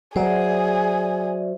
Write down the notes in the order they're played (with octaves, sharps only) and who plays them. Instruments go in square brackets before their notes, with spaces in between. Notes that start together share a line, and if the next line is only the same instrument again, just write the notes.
[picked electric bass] F#3 [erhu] G#4 [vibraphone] C5 D5 E5